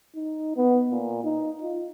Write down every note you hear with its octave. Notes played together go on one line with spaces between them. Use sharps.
D#4
B3
A#2
D#4
F4